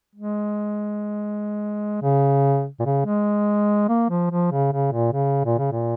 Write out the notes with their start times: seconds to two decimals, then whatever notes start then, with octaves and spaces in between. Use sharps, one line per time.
0.15 G#3
2.02 C#3
2.80 A#2
2.85 C#3
3.05 G#3
3.89 A#3
4.09 F3
4.30 F3
4.52 C#3
4.72 C#3
4.92 A#2
5.13 C#3
5.45 A#2
5.58 C#3
5.72 A#2